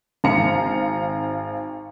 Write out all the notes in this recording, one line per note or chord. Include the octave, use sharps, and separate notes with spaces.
G#1 F5 A#5 C#7